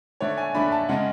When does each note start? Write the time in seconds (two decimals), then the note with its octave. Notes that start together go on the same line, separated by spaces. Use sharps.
0.20 D3 A3 D4 C#5
0.37 G#5
0.55 D3 A3 D4 B5
0.72 A5
0.89 C#3 G#3 C#4 F#5